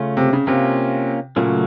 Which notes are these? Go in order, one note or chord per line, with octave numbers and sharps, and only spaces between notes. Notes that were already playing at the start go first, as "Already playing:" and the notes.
Already playing: C#3 A3 C#4 F4
C3
C#3
C3 A#3 C#4 F4
A#2 C#3 F#3 A3 C#4